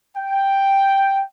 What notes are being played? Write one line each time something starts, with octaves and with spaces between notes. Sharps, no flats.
G5